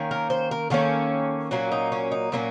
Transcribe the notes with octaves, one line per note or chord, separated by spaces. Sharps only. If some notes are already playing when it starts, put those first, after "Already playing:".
Already playing: D#3 A#3 C#4
A#4
C5
A#4
D#3 A#3 C#4 A4
A#2 F#3 A#3 C#4 F#4
D#4
C#4
D#4
A#2 F#3 A#3 C#4